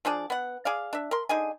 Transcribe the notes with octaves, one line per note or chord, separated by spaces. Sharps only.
F3 D4 G#4 D5
B3 F#5
G#4 D5 F5
D4 E5
A#4 C6
D3 D#4 G#4 G#5